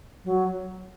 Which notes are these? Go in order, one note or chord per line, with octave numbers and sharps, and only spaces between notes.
F#3